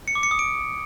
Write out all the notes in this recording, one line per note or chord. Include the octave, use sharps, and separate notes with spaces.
C#7
D6
C#7
D#6
D7